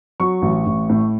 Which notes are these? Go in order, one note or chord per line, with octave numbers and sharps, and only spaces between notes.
F#3 C#6
A1
A1
A2